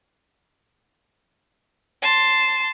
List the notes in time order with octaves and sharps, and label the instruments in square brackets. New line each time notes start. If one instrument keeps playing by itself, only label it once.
[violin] A5 C6